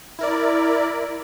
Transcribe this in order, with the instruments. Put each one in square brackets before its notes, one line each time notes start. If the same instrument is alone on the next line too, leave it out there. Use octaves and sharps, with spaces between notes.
[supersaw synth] E4 A#4 D5